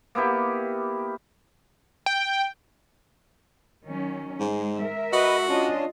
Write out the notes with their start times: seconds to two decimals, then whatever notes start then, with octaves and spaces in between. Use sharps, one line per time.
0.15 A#3 B3 E4 G4
2.06 G5
3.86 D#3 F#3 C#4
4.40 G#2 G#3
4.79 G#3 A#4 E5
5.13 F#4 B4 D#5
5.48 C#4 D4 F4 D#5